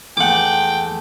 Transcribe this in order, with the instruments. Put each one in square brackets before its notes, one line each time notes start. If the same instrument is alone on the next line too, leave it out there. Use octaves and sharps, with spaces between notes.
[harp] E2 A3 [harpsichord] F#5 D6 [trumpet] G5